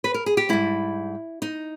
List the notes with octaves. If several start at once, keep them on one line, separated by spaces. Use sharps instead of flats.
B4
A#4
G#4
G4
G#2 G3 E4
D#4